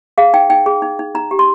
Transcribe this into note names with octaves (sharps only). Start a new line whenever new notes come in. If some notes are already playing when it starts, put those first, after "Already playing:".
G#4 F5
D#4 G5
D#4 G5
G#4
D#4
D#4
D#4 A#5
G4
C6